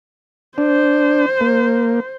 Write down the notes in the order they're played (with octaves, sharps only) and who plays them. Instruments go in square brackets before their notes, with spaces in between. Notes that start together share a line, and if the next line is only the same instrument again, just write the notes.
[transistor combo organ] D4 [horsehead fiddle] C5
[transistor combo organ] A#3